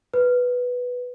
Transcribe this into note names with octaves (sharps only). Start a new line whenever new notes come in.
B4